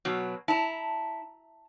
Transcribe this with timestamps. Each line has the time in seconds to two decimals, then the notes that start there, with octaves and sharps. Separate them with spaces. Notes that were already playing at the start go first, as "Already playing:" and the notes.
0.05 B2 F#3
0.48 E4 A5 A#5